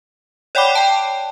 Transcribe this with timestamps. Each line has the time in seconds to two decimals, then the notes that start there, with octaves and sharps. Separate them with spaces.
0.55 C#5 D5 F#5 G5 B5 D6
0.75 G5 A5